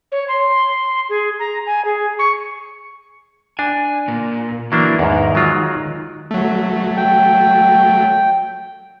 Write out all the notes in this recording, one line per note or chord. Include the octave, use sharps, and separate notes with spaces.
C#5
C6
G#4
A#5
G#5
G#4
C#6
D4 G#5
A#2
E3 F#3 A#3 D4
E2 G#2 D#3
F#3 G#3 F4
F#3 A3
G5